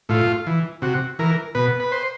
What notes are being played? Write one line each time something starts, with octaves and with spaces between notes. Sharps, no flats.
A2 F4
E3
C3 F#4
E3 A#4
B2 B4
B4
C5